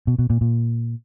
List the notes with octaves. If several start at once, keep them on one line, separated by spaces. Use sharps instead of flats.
B2
B2
A#2
A#2